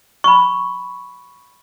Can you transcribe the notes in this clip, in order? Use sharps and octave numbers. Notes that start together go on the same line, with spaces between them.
B5 C#6